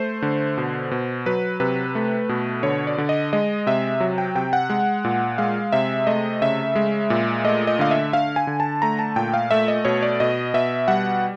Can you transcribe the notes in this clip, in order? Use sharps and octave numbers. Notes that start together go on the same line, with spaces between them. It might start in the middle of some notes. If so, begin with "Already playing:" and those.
Already playing: A3 C5
D3
B2
B2
F#3 B4
C3 B4
A3
B2
D3 C#5
D5
D3
D#5
G#3 D#5
C3 E5
F#3
G5
C3 G5
F#5
G#3
A#2
G#3 F5
C3 E5
A3 D#5
C#3 E5
G#3
A#2
A3 D#5
D#5
D3 F5
E5
D3 F5
G#5
D3
A5
A3 A#5
A5
A#2 G5
F5
A3 E5
D#5
B2 C#5
D5
B2 D#5
B2 E5
G3 F#5